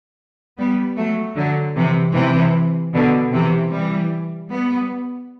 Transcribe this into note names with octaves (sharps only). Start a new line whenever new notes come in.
G3 B3
F#3 A3
D3 F#3
C3 E3
C3 E3
B2 D3
C3 E3
E3 G3
G3 B3